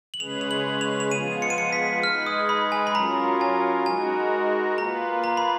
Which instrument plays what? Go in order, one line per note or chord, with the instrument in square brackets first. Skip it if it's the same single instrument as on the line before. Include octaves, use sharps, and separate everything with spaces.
[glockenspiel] F#7
[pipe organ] C#3 G#3 C#4 G#4 B4 [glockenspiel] F7
[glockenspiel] F7
F#7
F7
F7
[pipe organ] F3 G#3 B3 F4 G#4 [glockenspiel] D#7
[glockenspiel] C#7
D#7
C#7
B6
[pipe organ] G#3 D#4 G#4 B4 [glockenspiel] F6
[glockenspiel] D#6
B5
G#5
B5
[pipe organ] F#3 C#4 F4 A#4 [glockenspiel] A#5
[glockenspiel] G#5
[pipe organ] G#3 D#4 F#4 A#4 [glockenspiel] G#5
[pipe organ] A#3 F4 B4 [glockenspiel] A#5
[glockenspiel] A#5
B5